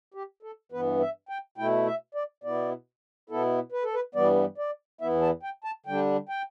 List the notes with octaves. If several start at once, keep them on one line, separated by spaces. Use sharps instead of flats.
G4
A4
G2 E3 B3 B4
E5
G5
B2 A3 E4 G5
E5
D5
B2 B3 E4 D5
B2 B3 E4 A4
B4
A4
B4
G2 E3 G3 B3 D5
D5
E2 E3 B3 E4 E5
A5
G5
A5
D3 G3 D4 G5
G5